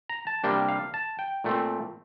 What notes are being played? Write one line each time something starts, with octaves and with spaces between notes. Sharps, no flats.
A#5
A5
C3 G3 A#3 D4 G5
F5
A5
G5
A#2 A3 C4